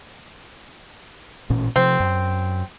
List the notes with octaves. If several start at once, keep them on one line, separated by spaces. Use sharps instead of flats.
A1 A#2 C#4
C3 F3 C4
F#2